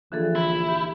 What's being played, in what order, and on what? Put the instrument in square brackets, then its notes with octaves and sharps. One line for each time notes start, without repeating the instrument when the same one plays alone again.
[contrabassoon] A#1 [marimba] D3 E3 A4
[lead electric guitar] E4
[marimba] G4